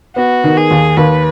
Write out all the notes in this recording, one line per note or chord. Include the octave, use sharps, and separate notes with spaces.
B3 F#4
D#3
G#4
D#2
D#2 B4